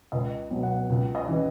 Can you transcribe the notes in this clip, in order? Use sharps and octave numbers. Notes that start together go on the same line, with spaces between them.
C#2 D#5
B2 F#3
F#5
C#2
D#5
C#3 E3